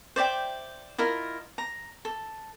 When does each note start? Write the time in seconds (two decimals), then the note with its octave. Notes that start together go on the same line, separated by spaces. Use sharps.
0.16 C5 D5 E5 G5
0.98 E4 F4 A#4 D#5
1.58 A#5
2.05 A4